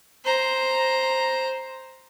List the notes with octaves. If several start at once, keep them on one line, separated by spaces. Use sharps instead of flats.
C5 A#5